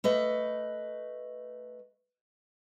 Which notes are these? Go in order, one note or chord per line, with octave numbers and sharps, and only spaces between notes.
A3 B4 D#5